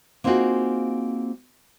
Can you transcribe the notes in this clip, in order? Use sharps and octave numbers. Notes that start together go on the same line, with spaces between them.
A#3 C4 D#4 F4 F#4 G#4